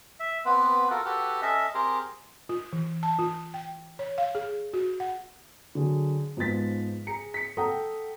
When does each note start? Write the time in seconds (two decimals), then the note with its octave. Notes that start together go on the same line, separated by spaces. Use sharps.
0.20 E5
0.45 B3 C4 B4
0.90 F4 F#4 A4 A#4
1.05 F#4 G4 A4 B4
1.42 C#4 A4 D#5 E5
1.75 C4 G4 G#4 A#4
2.49 F4
2.73 E3
3.03 A5
3.19 F4
3.54 G5
3.99 C#5
4.18 F5
4.35 G#4
4.73 F#4
5.00 F#5
5.75 D3 F#3 G#4
6.37 G#2 F3 B3 B4 A6 B6
7.07 G#4 A#5 C#7
7.34 B6 C#7
7.57 A4 F#5 G5 A#5 D#6